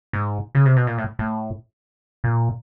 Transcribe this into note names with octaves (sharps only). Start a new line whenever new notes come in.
G#2
C#3
C3
B2
A#2
A2
A2
A#2